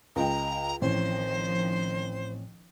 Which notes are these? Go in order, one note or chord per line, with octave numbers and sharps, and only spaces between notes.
C#2 D#5 G5 A#5
A1 A2 D#3 F3 C4 C5 C#5